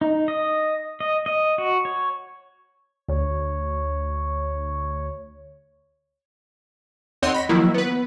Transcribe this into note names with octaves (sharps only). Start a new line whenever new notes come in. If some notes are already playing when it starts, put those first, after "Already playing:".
D#4
D#5
D#5
D#5
F#4
C#5
D2 C#5
D#2 C4 C#5 D#5 F#5 C6
B5 A#6 B6
D#3 F3 F#3 A#3 E4
B3 B4